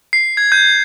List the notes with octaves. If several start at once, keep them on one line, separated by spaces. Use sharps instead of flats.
C7
G#6
G6